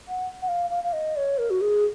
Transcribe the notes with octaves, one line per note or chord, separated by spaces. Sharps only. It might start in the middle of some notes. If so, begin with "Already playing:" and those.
F#5
F#5
F5
F5
F5
D#5
C#5
A#4
F#4
G#4